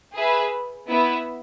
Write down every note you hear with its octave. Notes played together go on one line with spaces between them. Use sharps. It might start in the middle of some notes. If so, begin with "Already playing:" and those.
G#4 B4 E5 G#5
B3 E4 B4 E5